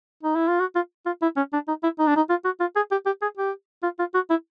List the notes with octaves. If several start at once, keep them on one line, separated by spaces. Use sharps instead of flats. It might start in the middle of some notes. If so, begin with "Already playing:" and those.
D#4
E4
F4
F#4
F4
F4
E4
C#4
D4
D#4
E4
D#4
D4
D#4
F4
F#4
F4
G#4
G4
G4
G#4
G4
F4
F4
F#4
E4